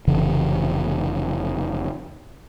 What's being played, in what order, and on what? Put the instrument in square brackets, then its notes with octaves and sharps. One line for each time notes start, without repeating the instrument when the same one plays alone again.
[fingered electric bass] F1 C#3 E3